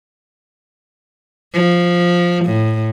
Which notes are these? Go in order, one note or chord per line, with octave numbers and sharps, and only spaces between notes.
F3
A2